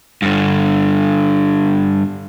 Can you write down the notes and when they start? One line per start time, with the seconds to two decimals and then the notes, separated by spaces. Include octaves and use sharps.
0.22 G2 D3